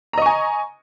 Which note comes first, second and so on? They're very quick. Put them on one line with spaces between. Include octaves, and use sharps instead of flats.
A#5 D#5 C#6 G#5